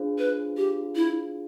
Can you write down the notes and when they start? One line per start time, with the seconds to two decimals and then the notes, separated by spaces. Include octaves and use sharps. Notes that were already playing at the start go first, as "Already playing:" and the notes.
Already playing: D4 F4 G#4 C5 F5
0.19 B4
0.57 G4
0.96 E4